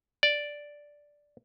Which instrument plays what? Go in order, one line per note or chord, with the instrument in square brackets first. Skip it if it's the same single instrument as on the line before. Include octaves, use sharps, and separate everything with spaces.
[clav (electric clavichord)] D5